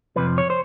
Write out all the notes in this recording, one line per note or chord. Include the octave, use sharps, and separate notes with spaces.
F2 C3 F3 B4
C#5
C5